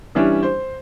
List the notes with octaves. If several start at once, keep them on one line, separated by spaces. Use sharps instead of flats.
E3 G3 C#4 D4 E4
C5